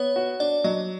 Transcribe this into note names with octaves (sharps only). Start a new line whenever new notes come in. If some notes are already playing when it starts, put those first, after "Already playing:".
Already playing: B3 C#5
F#4
D4 D5
F#3 D#5